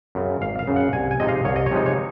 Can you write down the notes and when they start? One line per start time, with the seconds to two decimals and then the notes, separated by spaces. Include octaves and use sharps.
0.15 F#2 C#3
0.41 G#1 F5
0.59 F5
0.67 F#2 C#3
0.76 F#5
0.93 C2 G#5
1.11 G#5
1.20 C3 F3 G#3 D#4 D#5
1.28 F5
1.45 C2 C#5
1.56 D#5
1.66 C#5
1.71 C3 F3 G#3 D#4
1.86 C#5